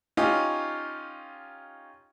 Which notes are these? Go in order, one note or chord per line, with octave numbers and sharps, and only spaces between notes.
C#4 D#4 F4 G4